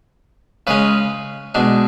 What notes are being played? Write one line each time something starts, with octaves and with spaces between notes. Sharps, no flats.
C#3 G#3 C#4 B4
B2 G#3 D4